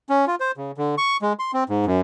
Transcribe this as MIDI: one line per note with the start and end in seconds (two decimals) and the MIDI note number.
0.09 0.25 61
0.27 0.35 65
0.40 0.51 72
0.57 0.72 49
0.78 0.95 50
0.98 1.17 85
1.22 1.33 56
1.39 1.51 84
1.53 1.64 60
1.69 1.85 44
1.86 2.01 42